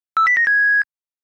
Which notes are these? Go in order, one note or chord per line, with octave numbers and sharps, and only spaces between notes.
E6
B6
A#6
G#6